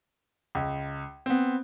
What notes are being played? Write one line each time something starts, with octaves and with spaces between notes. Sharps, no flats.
C#2
B3 C4